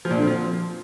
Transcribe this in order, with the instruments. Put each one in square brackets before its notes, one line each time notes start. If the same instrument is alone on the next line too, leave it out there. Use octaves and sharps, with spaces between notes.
[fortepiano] F3
A#2
D3
C4
F3